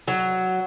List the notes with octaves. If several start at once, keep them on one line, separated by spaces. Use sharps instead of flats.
F#3